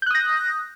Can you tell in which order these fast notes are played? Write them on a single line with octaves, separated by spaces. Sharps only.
G6 F#6 D#6 A#6